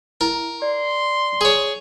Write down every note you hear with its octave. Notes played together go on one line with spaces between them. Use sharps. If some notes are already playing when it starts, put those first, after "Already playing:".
E4 A#4
D5 C6
G#4 C#5